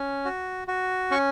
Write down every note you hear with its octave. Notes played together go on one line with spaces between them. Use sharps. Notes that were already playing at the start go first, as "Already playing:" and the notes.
Already playing: C#4
F#4
F#4
C#4 C#6